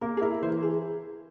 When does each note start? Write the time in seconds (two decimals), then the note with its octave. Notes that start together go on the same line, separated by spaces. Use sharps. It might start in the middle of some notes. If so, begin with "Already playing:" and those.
0.01 A#3 A#4
0.17 G#4
0.21 E4 A#4
0.42 E3 C5
0.63 G#4